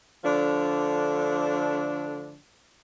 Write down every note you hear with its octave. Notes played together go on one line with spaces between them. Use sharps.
D3 F3 A3 D4